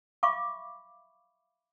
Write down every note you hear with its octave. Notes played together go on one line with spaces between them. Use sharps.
E5 F5 B5 C#6 D6